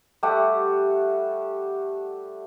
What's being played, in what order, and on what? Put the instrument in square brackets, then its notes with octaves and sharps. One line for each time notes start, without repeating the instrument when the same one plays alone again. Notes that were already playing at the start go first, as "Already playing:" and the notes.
[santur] G3 A3 G4 F#5